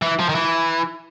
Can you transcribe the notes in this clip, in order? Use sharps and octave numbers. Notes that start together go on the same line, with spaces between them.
E3
F3
D#3
E3